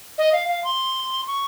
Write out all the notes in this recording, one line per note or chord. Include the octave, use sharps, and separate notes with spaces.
D#5
F5
F5
C6
C#6